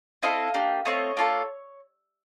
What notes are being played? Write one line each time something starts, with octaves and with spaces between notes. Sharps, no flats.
C4 E4 A4 D#5 F5
A#3 D4 G4
A3 C4 F4 C#5 D#5
A#3 D4 F4 A4